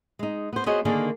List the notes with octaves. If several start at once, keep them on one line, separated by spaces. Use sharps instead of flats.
G#3 D#4
B3 C5
B3 F#4 G#4 C5 C#5 D#5
D3 D#3 A#3 D4 G#4 D5